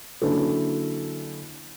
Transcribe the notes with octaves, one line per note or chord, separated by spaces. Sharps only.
D3 F#3 A#3 C#4 E4 A4